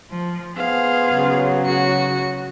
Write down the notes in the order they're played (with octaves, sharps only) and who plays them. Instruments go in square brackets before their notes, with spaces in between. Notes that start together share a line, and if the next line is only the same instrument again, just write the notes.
[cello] F3
[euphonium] B3 [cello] G#4 C5 [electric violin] F5
[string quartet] C#3 F#3
[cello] F#4 [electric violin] C#7